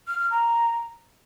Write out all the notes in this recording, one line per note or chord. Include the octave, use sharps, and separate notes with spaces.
F6
F6
A#5